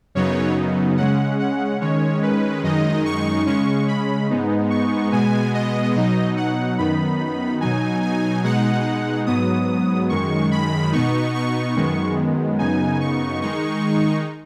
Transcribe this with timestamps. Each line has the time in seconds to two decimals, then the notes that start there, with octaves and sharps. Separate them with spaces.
0.15 F#2 C#3 F#3 B3 D#4 C#5
0.97 C#3 G#3 C#4 F#5
1.39 F#5
1.81 D#3 G#3 C#4 C#5
2.23 B4
2.63 F#2 D#3 G#3 D#4 D#5
3.06 C#6
3.46 C#3 G#3 C#4 C#6
3.88 B5
4.30 G#2 G#3 B3 D#4
4.70 C#6
5.12 B2 G#3 B3 G#5
5.54 D#5
5.95 B2 F#3 D#4
6.37 F#5
6.78 F#2 D#3 B3 D#4 B5
7.61 B2 F#3 D#4 G#5
8.03 G#5
8.44 B2 G#3 D#4 F#5
9.26 G#2 F#3 B3 D#6
10.09 F#2 D#3 G#3 C#6
10.51 B5
10.92 B2 B3 D#4 C#6
11.34 C#6
11.76 F#2 D#3 G#3 B3
12.59 F#2 C#3 B3 D#4 G#5
13.00 C#6
13.41 D#3 G#3 D#4 C#6